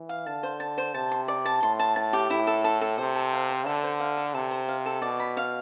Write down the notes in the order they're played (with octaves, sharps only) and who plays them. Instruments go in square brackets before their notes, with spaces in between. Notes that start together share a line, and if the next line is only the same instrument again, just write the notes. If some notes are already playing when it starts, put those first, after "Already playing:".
Already playing: [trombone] E3
[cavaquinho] F5
[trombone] D3 [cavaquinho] A5
[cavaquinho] C5
A5
C5
[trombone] C3 [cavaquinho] A5
[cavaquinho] C6
D5
A5
[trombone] A2 [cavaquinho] C6
[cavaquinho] A5
A5
G4
[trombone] A2 [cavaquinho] E4
[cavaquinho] A4
A4
A4
[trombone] C3 [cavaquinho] C5
[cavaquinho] A4
F5
C5
[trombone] D3 [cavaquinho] A4
[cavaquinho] C5
F5
A4
[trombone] C3 [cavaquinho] A4
[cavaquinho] C5
F5
A4
[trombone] B2 [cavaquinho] D5
[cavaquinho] B5
F5